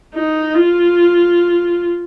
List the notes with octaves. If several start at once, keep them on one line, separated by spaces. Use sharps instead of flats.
D#4
F4